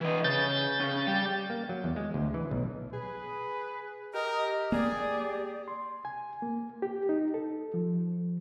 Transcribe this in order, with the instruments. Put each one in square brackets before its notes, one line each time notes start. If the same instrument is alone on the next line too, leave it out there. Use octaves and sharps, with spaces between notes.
[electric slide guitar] E3 D#5
[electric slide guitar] C#3 [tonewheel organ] G6 A6
[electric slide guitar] C#3 C#4
G3
[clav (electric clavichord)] A#3
F#3
E2
G#3
D2
E3
B1
[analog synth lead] G#4 [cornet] B4
[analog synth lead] G4 [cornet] A#4 [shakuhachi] D#5
[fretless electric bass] A#3 [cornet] G#4 [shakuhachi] D5
[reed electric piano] C6
G#5
A#3
G4
D#4
A4
F3